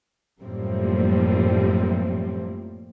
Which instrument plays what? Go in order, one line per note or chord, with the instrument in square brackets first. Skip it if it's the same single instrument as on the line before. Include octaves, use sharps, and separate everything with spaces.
[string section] F#2 A2 F3 G3 A#3 C4